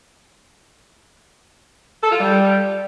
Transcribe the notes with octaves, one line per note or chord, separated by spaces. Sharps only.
A4
F4
G3